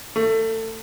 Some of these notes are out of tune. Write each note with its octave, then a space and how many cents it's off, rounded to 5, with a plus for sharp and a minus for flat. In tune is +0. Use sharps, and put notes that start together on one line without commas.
A3 +25